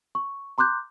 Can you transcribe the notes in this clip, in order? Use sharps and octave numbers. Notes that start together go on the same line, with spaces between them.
C#6
A#5 C6 D6 F#6 G6